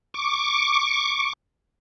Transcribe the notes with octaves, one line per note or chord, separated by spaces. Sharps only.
C#6 D6